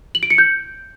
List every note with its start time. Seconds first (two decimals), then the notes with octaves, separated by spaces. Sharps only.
0.15 F#7
0.23 D7
0.30 C#7
0.38 G6